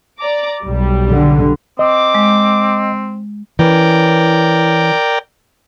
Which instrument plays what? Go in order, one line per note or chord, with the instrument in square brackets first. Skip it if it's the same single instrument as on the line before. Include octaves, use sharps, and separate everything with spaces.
[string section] D5 A#5 D6
B1 G3
[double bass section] D3
[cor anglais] C4 [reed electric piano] D#5 [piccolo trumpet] D6
[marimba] G#3
[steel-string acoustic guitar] E3 C#4 [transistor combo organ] A#4 D5 G5